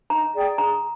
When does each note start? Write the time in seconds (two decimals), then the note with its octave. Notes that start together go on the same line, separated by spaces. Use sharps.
0.10 D#4 A#5
0.35 G#4 D5 G5
0.58 G#4 A#5